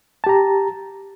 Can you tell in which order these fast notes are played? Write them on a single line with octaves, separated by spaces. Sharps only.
A5 G4 A#5